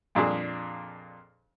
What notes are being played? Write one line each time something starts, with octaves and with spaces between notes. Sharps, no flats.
F2 A#2 D4 G#4